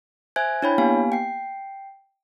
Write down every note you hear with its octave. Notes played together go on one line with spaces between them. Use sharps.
C5 E5 G#5 F#6 G#6
D4 E4 C#5 G5 B5
A#3 B3 G4 F5 G#5
G5 C7